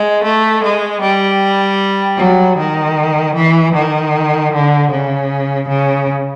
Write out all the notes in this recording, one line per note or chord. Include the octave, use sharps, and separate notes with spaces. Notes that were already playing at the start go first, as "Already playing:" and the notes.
Already playing: G#3
A3
G#3
G3
F#3
D#3
E3
D#3
D3
C#3
C#3